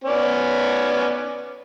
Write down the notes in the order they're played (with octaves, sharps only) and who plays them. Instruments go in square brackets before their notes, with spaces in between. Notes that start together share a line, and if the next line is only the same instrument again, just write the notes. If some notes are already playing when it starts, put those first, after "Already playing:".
[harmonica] B3 C#4 D5